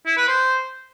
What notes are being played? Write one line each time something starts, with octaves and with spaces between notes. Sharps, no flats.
E4
B4
C5